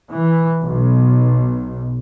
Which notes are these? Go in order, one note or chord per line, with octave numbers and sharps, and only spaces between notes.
E3
B1